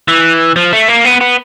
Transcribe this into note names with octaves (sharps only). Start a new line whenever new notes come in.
E3
F3
A3
A#3
B3
B3